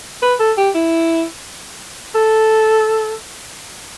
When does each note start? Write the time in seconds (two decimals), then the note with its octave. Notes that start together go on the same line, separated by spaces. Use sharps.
0.22 B4
0.40 A4
0.57 G4
0.75 E4
2.15 A4